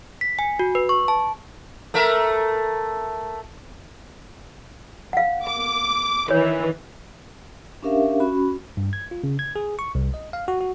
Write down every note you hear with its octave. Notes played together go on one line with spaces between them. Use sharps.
B6
G#5
F#4
B4
C#6
A5
A3 A#4 E5
F5 F#5
D6
D#3 E3 C#5
C#4 D4 G4 A#4 E5 F5
C#4 F#4 B5
G2
G#6
F4
C#3
G#6
G#4
C#6
C2
D#5
F5
F#4
F#4